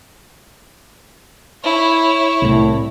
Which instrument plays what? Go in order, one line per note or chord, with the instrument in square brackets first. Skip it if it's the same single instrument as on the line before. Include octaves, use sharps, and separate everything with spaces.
[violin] E4 C#5
[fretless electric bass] C2 A2